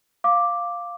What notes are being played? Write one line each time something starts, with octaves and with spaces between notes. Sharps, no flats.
F5 D6